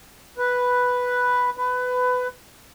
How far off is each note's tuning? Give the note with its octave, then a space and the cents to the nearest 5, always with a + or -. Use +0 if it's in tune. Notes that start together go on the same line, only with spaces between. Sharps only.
B4 +0
B4 +20